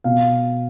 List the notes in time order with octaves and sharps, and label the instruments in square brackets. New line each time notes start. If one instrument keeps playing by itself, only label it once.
[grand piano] B2 F5